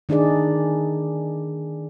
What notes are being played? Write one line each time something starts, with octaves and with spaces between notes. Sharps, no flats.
D#3 D4 D#4 G#4 D5